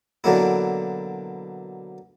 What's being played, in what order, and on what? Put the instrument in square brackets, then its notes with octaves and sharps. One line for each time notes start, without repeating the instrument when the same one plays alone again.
[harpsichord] B2 D3 F#3 A#3 E4